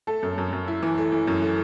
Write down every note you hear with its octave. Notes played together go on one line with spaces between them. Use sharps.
A3 A4
F#2
F#2
F#2
E4
E3
A3
E3
F#2
A3